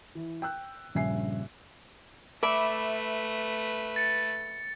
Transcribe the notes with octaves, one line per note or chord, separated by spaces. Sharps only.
E3
G5 E6 F#6
A#1 G2 C#3 E5 G#5 C7
A3 B4 D5 E5 B5
A6 C#7